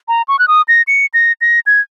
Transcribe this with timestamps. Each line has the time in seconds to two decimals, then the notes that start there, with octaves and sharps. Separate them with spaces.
0.08 A#5
0.28 C#6
0.39 F#6
0.48 D#6
0.68 A#6
0.87 C#7
1.14 A#6
1.41 A#6
1.66 G#6